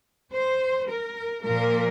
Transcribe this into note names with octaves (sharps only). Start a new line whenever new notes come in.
C5
A#4
A#2 F3 A#3 A#4